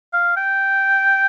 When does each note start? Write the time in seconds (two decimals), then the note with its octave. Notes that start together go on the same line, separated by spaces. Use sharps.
0.13 F5
0.36 G5